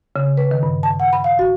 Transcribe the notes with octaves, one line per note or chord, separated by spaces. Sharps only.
C#3
B4
D#3
G2
A5
F#5
B5
F5
F#4